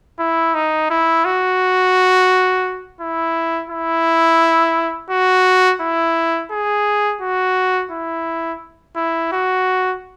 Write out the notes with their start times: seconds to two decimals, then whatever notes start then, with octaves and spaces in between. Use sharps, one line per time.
0.19 E4
0.54 D#4
0.90 E4
1.25 F#4
3.00 E4
3.70 E4
5.11 F#4
5.81 E4
6.51 G#4
7.21 F#4
7.91 E4
8.96 E4
9.32 F#4